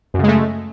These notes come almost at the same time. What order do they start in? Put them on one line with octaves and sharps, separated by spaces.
F#2 C#3 G#3 A3